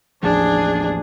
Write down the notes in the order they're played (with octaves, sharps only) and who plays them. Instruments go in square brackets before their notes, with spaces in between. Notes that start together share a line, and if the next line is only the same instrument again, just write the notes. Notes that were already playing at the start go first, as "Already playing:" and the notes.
[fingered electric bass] A1 D#2 F3 [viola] D4 G#4